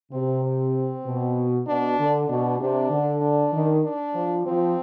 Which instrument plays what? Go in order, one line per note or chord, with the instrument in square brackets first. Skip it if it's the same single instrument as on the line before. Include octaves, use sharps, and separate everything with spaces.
[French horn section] C3 [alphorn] C4
[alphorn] C4
[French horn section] B2
[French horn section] B2 [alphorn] D4
[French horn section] D3
[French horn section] B2 [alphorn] D4
[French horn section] C3 [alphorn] D4
[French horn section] D3
[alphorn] D4
[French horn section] D#3
[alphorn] D4
[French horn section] F3
[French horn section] F3 [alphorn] C4